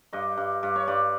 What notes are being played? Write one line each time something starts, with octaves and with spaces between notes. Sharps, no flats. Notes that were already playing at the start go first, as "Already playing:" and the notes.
G2 D#5
G2
G2
C#5
G2 D5